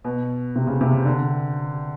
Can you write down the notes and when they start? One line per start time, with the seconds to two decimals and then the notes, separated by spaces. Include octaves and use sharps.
0.04 B2
0.56 C3
0.67 C#3
0.81 C3
0.93 C#3
1.05 D3